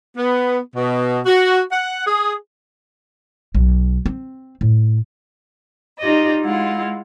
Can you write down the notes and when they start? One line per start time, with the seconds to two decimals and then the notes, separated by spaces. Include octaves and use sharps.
0.17 B3
0.75 B2
1.26 F#4
1.72 F#5
2.06 G#4
3.55 B1
4.06 C4
4.61 A2
5.99 D#4 F4 G4 D5 D#5
6.43 G#3 E4 F4 F#5